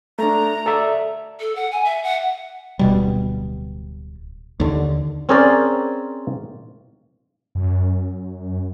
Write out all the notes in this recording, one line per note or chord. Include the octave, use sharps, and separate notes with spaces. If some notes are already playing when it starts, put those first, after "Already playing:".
A3 D4 A#5
A4 D5 E5
A4
F#5
G#5
E5
F#5
D1 B2 G3
D#2 D3
C4 C#4 G#4 A#4 C5 D5
F#2